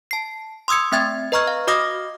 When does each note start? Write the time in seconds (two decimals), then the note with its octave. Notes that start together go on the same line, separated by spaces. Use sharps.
0.11 A5 C7
0.68 C6 D#6 E6 G#6 C#7
0.92 A3 C4 E5 G5 G#6 A6
1.32 B4 D#5 A#5 C#6 F6 G#6
1.47 F5
1.67 F#4 D#5 D6 D#6 F6 A#6